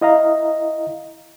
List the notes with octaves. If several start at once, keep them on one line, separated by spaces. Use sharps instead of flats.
E4 D#5 F5 A#5